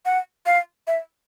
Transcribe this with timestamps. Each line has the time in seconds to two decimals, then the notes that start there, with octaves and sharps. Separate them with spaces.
0.05 F#5
0.46 F5
0.87 E5